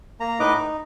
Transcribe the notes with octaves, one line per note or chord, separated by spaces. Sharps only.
A#3 A#5
A2 D#4 B4 D#5 D6
D#4